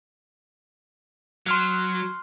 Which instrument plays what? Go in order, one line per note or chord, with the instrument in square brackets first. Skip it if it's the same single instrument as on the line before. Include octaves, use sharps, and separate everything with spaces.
[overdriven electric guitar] F#3 [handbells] C6 F6 F#6